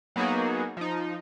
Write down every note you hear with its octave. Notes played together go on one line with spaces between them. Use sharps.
F#3 A#3 B3 D#4 F#4 G#4
F3 D#4